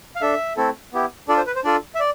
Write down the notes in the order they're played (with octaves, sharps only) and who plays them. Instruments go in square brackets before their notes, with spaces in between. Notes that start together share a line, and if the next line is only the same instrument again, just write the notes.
[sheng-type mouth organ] F5
D4 A4 E5
A3 C4 E4 A4
B3 E4 G4
D4 F4 A4 D5
C5
B4
C5
D4 F4 A4 D5
E5
D5